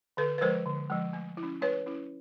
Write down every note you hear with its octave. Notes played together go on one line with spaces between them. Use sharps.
D3 A4 B4
B4
F3 G#3 A#4 C5
D3
F3 G#3
A3
E4
C#4
A3 B4 C#5
C#4 E4